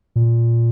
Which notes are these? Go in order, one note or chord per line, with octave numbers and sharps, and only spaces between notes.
A#2